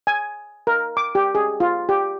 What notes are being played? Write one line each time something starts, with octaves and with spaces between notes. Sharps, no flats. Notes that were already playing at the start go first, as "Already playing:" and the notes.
G#5
A#4
D6
G4
G#4
F4
G4